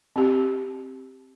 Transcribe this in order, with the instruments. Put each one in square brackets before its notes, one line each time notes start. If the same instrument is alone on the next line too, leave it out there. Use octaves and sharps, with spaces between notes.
[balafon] C4 G4